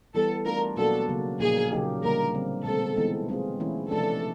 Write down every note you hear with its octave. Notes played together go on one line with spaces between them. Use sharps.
E3 G3 B3 A4
A3 D4 F4 A#4
B2 F#3 A#3 D4 F#4 A4
C#3 F#3 A#3
A#2 F3 A#3 D#4 G#4
C#3 F#3 A#3 D#4 G4
D3 G3 A#3 A#4
D3 G3 C4
B2 G#3 C4 A4
E3 G#3 B3 D#4
G#3 C4 F4 G#4
E3 A3 C#4 E4
C3 F3 A3 D4 A4